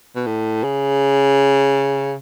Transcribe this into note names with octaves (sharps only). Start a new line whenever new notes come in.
B2
A2
C#3